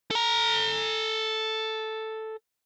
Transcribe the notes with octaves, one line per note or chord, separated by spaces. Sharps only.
A4 A#5